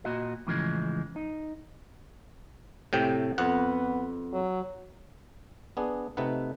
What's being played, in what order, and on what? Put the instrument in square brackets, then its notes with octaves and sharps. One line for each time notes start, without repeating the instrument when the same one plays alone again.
[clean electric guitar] A#2 F#4 D#5
A2 C#3 E3 F3 G3 G#3
D#4
[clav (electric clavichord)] A2 C3 G5
[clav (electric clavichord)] F2 F#5 [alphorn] B3
[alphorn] F#3
[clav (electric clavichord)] B3 D4 G#4
C3 A3 D#4 B4 F#5